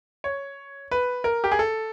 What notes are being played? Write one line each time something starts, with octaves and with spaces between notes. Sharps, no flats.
C#5
B4
A#4
G4
G#4
A4